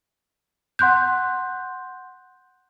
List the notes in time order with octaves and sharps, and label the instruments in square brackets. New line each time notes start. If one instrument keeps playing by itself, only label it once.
[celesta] F#5 C6 F#6 G6